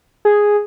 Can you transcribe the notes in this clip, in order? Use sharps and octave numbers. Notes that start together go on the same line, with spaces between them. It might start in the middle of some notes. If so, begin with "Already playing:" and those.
G#4